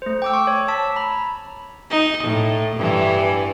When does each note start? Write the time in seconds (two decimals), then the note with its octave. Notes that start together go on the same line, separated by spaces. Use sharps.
0.02 A3 C5
0.22 G5 D6 E6
0.33 C#6
0.47 C#5
0.68 A5 E6 B6
0.96 A#5 B5
1.90 D#4
2.23 A2
2.76 G2 E3